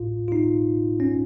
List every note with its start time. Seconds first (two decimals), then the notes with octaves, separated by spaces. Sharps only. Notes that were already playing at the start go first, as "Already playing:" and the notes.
Already playing: A1 A2 F4
0.28 F4
0.32 D#4
1.00 C#4